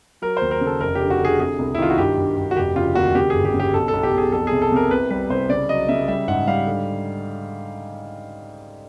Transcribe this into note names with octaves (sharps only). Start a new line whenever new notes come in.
F#3 A#4
D#2 C5
A#4
C#3
A4
F1 A#4
G4
D3
F#4
D3 G#4
C3 G#4
C2
E4
D#3 F4
F#4
G2 G4
G2
G2
F#4
F1 G4
C#3 F4
D#2 F#4
C#3 G4
G1 G#4
G4
C#3
G4
B1 A4
A4
B1
G4
B1 G#4
F2 A4
C3 G#4
A4
C3 A#4
C2 B4
G3 B4
C2 C5
C#3 D5
F#3 D#5
C#3 E5
G3 E5
G#2 F#5
G3 F5
D3